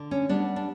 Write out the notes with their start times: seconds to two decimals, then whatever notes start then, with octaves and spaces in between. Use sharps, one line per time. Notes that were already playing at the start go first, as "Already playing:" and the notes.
Already playing: D3
0.11 C#4
0.29 G3 B3 D4
0.56 D4